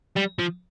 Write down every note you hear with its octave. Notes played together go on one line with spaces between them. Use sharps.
G3
F3